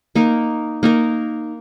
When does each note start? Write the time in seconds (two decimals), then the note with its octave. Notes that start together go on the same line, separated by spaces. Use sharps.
0.15 A#3 D#4 A#4
0.83 A#3 D#4 A#4